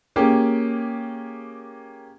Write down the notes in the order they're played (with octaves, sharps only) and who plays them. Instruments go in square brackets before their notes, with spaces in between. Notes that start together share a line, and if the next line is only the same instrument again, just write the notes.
[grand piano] A#3 C#4 G4 G#4